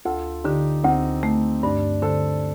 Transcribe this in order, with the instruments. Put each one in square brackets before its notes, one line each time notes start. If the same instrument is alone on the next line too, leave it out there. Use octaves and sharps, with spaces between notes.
[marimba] D2 [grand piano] F4 A4
[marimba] D3 [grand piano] D#4 G4
[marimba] D2 [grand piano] C4 D#4
[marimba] A3
[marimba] G2 [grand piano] D4
[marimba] D3 [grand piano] A4 C5